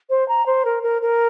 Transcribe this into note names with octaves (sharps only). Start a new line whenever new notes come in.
C5
A#5
C5
A#4
A#4
A#4